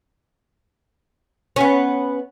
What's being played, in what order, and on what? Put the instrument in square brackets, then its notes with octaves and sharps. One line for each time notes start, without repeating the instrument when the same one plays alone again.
[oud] B3 C#4